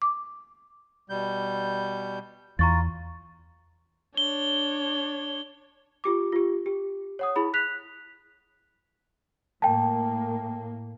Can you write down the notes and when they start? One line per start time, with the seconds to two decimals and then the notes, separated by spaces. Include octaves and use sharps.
0.02 D6
1.10 B2 G3 G6
2.59 E2 F4 A#5 C#6 A6
4.17 D4 C#5 G7
6.04 F4 G4 D6
6.32 F4 G4
6.66 G4
7.19 C#5 F#5 D#6
7.36 E4 G#4 B5
7.54 F#6 B6 F7
9.62 A2 A#3 G5 A5